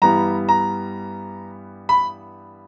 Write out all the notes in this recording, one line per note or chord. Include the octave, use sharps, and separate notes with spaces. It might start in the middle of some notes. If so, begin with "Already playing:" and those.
G2 E3 G3 B3 A#5
A#5
B5